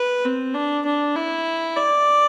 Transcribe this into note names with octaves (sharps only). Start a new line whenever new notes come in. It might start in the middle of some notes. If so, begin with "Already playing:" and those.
Already playing: B4
C4
D4
D4
E4
D5